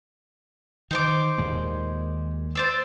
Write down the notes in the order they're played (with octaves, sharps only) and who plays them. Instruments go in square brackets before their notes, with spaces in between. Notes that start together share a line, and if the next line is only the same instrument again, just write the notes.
[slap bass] D#3 [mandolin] D#4 C5 D6
[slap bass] D#2 A#2 G#3
[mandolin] C5 D5 E6